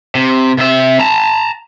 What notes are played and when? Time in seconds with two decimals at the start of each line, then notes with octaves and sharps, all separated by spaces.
0.15 C3
0.58 C3 E5
1.00 A5 A#5